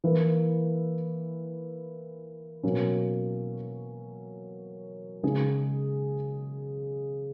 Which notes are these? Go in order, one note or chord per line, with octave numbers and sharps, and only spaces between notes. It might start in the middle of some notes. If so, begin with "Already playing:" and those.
E3 A#3 E4 B4
B2 F#3 A#3 C#4
C#3 G#3 D#4 G#4